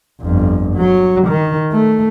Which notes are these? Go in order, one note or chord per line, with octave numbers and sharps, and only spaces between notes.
G1 F2
F#3
D#3
A3